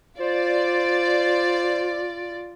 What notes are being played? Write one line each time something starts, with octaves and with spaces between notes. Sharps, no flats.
F4 C5 D5